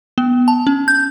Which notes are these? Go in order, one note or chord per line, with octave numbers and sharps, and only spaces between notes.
B3
A5
C#4
G6